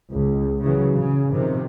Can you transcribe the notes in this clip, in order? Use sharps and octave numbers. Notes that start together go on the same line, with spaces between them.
C#2
C#3 E3 F#3
C#3
C3 D#3 F3